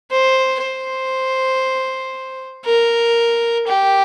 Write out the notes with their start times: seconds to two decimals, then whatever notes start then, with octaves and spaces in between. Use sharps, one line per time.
0.11 C5
0.62 C5
2.66 A#4
3.67 G4